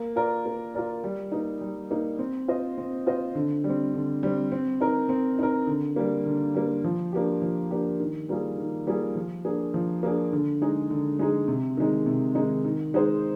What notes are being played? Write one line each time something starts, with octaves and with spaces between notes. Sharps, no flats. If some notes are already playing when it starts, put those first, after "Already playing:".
Already playing: A#3
F4 A#4 D5
A#3
F4 A#4 D5
G3
A#3 D#4
G3
A#3 D#4
C4
F4 C5 D#5
C4
F4 C5 D#5
D3
G3
C4
D3
G3 C4
C4
D#4 A#4
C4
D#4 A#4
D3
G3 A#3
D3
G3 A#3
F3
A#3 D4 G4
F3
A#3 D4 G4
D#3
G3 A#3 F4 G#4
D#3
G3 A#3 F4 G#4
F3
A#3 D4 G#4
F3
A#3 D4 G#4
D3
G#3 D#4 G#4
D3
G#3 D#4 G#4
C3
D#3 G#3 D#4
C3
D#3 G#3 D#4
D#3
G#3 D#4 G#4 C5